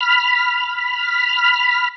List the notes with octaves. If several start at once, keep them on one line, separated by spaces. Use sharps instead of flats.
B5 F6